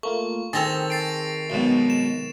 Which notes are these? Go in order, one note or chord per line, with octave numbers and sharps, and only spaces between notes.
A3 A#3 F4 C#6
D#3 C4 G#4 A4 A6 A#6 F7
A6 C7 D7
B1 G#2 B2
E7